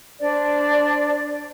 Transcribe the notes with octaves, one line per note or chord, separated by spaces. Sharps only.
D4 C5 D5